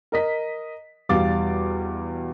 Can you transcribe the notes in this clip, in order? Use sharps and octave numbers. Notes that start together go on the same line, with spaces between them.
A#4 D#5 B6
E2 B2 G3 F5 D6 A6